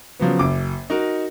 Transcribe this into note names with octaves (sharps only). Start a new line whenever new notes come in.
C#3 F3 F#3 B3
F#1 D6
D#4 F#4 A#4